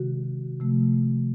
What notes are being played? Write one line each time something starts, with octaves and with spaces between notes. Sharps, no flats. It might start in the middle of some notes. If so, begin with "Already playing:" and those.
Already playing: C3 D#3 G#3 F#4
C3 F3 A3